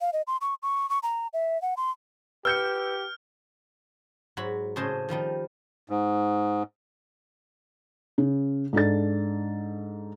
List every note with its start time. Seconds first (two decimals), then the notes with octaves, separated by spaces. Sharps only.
0.01 F5
0.13 D#5
0.27 C6
0.41 C#6
0.63 C#6
0.90 C#6
1.03 A#5
1.33 E5
1.62 F#5
1.77 C6
2.45 G4 B4 E6 F6 G6 C#7
4.37 G#2 F#3 F#4 B5
4.76 A2 C#3 G#4 C5 D#5 A5
5.09 D#3 F3 G3 D#4
5.90 G#2
8.18 C#3
8.73 G#2 D4 A4 A6